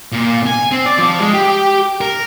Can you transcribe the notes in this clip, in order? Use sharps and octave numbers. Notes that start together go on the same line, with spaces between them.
A#2
G#5
C4
D5
F3
G#3
G4
A#4